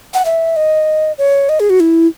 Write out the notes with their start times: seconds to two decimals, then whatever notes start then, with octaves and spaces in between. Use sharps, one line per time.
0.14 F#5
0.25 E5
0.56 D#5
1.18 C#5
1.49 D#5
1.60 G#4
1.70 F#4
1.80 E4